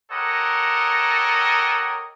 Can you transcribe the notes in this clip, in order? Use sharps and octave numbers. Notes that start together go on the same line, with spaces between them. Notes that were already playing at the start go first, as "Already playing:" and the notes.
G4 A4 A#4 C#5 D#5 F#5